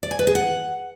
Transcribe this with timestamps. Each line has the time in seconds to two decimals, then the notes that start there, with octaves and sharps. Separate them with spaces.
0.03 D5
0.11 G#5
0.19 B4
0.27 G#4
0.35 F#5